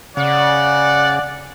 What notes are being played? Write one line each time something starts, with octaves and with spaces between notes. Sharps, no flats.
C#3 D5 F#5